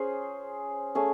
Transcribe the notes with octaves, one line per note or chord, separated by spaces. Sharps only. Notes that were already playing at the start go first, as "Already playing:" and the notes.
Already playing: C#4 G#4 C5
A3 C#4 G#4